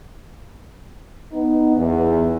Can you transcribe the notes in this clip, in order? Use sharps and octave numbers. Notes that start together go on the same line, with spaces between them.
B3 D#4
E2